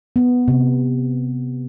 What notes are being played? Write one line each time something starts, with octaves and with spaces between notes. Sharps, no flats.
B3
C3